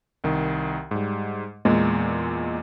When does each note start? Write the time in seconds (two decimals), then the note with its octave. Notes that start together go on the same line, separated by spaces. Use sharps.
0.24 C2 D#3
0.91 G#2 G3
1.65 E2 A#2 G#3